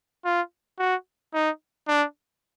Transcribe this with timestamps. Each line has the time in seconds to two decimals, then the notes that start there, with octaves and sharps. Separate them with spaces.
0.25 F4
0.79 F#4
1.34 D#4
1.88 D4